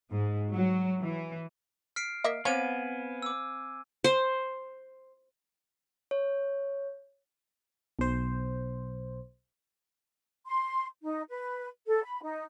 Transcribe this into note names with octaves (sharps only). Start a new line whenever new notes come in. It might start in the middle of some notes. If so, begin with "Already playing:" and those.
G#2
F#3
E3
F6 B6 C7 D7
A#3 D#5 E5
B3 C4 C5 C#5 F5 G#5 G#6 D#7
D6 E6
C5
C#5
B1 C5
C6
D#4
B4
A4
B5
D#4